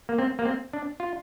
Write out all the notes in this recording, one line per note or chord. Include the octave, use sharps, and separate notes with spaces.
A#3
C4
A#3
C4
D4
F4